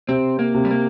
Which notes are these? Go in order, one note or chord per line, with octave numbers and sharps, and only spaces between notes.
C3 C4
A#3
C3
G3
A#3